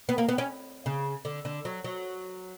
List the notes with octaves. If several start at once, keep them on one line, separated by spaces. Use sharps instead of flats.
B3
A#3
B3
C#4
C#3
D3
D3
F#3
F#3